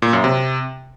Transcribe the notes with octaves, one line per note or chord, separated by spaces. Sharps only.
A#2
F#2
C3